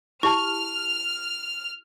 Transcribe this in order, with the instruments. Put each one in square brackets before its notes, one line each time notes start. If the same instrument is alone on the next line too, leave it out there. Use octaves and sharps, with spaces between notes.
[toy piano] E4 G4 A5 [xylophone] C#6 [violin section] F6